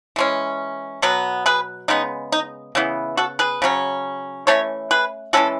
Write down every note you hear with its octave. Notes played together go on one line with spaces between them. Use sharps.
E3 G#3 C#4
B2 F#3 B3
G#4 B4
C#3 G#3 B3 D#4
D#4
C#3 E3 B3
F#4 A4
G#4 B4
C#3 F#3 C#4
E3 A3 C#4 A4 C#5
G#4 B4
E3 G#3 C#4 F#4 A4